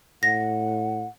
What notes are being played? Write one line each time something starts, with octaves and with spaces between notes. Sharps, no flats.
A2 F#5 A#6